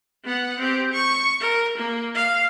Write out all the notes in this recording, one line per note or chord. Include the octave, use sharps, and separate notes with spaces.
B3 F#5
C4 G4
C#6
A#4
A#3
F5